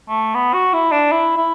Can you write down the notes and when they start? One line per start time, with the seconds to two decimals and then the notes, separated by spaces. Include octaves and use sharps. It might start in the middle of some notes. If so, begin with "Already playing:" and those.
0.09 A3
0.34 B3
0.54 F#4
0.74 E4
0.92 D4
1.12 E4
1.37 E4